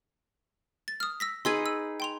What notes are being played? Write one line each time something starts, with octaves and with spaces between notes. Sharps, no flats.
A6
D#6 F6
E6 A#6 B6
D#4 G#4 B4 C6 E6 G#6
E6
G5 C6 F7